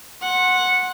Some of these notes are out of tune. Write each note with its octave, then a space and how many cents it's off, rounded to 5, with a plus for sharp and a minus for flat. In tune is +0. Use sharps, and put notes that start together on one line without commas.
F#5 -10 C6 +20